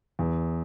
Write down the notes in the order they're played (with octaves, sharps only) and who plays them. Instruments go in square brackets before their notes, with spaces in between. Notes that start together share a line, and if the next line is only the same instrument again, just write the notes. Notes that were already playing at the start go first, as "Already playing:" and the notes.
[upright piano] E2